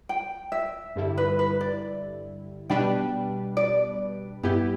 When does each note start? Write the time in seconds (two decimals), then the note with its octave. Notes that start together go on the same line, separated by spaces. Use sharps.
0.09 G5
0.52 E5
0.96 G2 D3 G3 E4
1.17 B4
1.39 B4
1.61 D5
2.70 B2 G3 D4 B4 G5
3.57 D5
4.43 G2 G3 B3 E4 G4